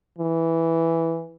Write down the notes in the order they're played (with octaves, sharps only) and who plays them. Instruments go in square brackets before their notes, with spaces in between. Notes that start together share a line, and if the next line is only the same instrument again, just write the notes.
[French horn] E3